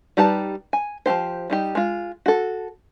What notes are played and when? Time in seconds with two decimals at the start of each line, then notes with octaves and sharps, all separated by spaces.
0.17 G3 D#4 G4 B4 A5
0.73 G#5
1.06 F3 C4 G4 C5
1.50 G3 D#4 G4
1.75 G#3 F4
2.26 F#4 A4